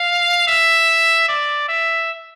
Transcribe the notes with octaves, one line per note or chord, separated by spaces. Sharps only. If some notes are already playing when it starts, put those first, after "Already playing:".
Already playing: F5
E5
D5
E5